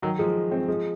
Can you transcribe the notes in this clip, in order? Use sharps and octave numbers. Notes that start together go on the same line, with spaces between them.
D#3 F#3
F3 G#3
G#3 C4
F3 G#3